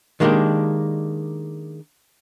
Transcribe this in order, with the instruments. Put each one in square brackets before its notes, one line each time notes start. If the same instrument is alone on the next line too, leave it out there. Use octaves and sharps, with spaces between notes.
[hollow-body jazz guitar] D#3 G#3 A#3 B3 D4 G4